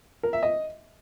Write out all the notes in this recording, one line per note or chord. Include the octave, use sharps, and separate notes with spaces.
A#4
E5
D#5